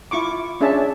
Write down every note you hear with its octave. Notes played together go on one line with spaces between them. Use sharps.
E4 F4 C#6 D6
C#4 D4 G#4 E5 A5